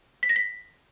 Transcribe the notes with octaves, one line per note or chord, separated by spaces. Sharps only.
B6
A#6
B6